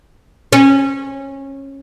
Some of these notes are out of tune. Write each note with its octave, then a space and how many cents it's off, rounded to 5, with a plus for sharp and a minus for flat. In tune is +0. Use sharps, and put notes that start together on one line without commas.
C#4 -20